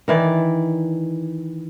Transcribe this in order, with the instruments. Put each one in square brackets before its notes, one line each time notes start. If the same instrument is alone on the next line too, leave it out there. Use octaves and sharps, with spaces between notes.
[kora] D#3 E3 D5